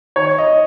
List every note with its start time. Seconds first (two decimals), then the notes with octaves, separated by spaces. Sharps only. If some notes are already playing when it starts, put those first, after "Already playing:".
0.16 D#3 C#5
0.38 D#5